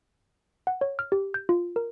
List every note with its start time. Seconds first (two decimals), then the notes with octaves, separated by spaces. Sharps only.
0.67 F#5
0.81 C#5
0.99 F6
1.12 G4
1.34 G6
1.49 F4
1.76 A#4